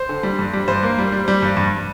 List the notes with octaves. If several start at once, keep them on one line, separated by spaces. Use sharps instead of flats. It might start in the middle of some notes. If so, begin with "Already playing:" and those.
Already playing: C5
D3
G3
G2
G3
G2 C5
A#3
G3
G3
G3
G2
G2